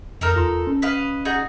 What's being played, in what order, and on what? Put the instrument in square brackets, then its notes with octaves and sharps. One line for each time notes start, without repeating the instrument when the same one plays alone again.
[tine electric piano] F2 F6 [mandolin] D#4 A4 A#4
[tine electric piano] E2 F4 C6
C#4
[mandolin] B4 D#5 F5
D#4 F#4 G#4